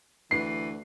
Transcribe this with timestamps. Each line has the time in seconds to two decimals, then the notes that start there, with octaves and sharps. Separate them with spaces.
0.31 D2 E3 C7